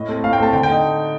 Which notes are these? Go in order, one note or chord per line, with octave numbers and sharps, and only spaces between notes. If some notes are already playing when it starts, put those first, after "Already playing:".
Already playing: A2 D#5
A3 C4
A2 F5
G5
A3 C4 A5
D3 G5
G5
A3 D#4